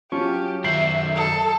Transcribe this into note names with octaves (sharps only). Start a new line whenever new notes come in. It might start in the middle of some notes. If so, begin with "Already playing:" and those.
F#3 C#4 F4 G4 A5 C#6
F#2 D#3 E5 G6 C7 F#7
A4